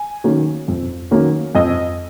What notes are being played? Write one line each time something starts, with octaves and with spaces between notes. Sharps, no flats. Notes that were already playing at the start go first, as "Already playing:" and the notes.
Already playing: G#5
D#3 F#3 A#3 C#4
F2
D#3 F#3 A#3 C#4
F2 D#5